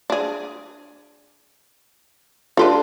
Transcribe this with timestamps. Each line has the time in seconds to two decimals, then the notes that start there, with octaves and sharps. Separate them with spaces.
0.10 D4 G#4
2.57 D4 F4 G4 A4 B4 C6